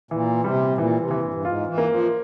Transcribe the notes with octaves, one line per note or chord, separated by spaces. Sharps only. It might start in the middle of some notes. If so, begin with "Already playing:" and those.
A#2 E3
C3 G3
A#2 E3
C3
E3
G2
G2
G#2 F4
E3
A#3
F3